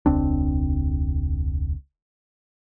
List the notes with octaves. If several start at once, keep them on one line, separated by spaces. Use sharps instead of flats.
E1 C#2 C4 D4